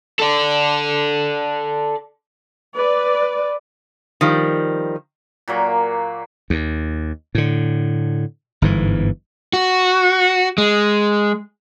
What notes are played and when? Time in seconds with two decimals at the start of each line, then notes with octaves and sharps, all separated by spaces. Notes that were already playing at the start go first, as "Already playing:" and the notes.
0.20 A4 D5
2.76 B4 D5
4.21 D#3 F3 G3
5.48 A#2 F#3 A#3
6.50 D#2
7.35 A2 D3
8.62 G1 G#2 E3
9.53 F#4
10.58 G#3